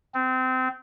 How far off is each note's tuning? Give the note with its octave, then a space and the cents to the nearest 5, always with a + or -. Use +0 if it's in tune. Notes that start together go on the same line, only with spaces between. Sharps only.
C4 -25